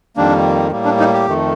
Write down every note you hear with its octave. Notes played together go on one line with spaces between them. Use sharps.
F2 D#3 G3 A#3 D4
A2 G3 A#3
D4
D#4
G4
F2 D#3 A3